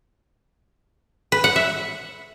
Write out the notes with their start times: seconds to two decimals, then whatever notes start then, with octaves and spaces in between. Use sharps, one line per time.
1.32 B4
1.44 F#5
1.56 E5